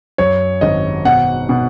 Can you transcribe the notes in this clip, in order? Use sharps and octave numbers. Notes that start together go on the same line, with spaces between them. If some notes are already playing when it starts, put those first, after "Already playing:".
F#2 C#5
G#1 D#5
B2 F#5
B2